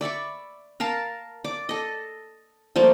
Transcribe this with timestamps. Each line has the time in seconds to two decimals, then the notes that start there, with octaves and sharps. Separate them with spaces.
0.01 D5 E5 B5 C#6
0.80 A#4 F5 A5 A#5
1.44 D5 D6
1.69 A4 D#5
2.76 F3 G3 A3 A#3